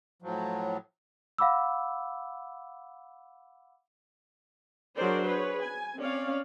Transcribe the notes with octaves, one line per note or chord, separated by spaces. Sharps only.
A2 F3 F#3
F5 F#5 B5 D6 E6
F#3 D4 G#4 A#4 C5 D5
G#4 B4 C#5
G#5
C4 C#4 C#5 D5 F5